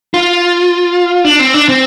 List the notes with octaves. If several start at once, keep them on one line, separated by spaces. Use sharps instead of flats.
F4
D4
C4
D4
C4